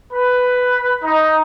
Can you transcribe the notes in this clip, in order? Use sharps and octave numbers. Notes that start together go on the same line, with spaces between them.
B4
D#4